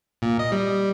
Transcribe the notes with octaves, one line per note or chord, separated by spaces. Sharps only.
A#2
D#5
G3